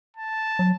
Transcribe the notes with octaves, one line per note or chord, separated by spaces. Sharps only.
A5
F#3